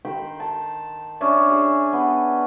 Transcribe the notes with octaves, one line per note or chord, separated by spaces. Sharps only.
D#3 C5 G5 B5
A5
C#4 D4 C5 E5
G#4
B3 B4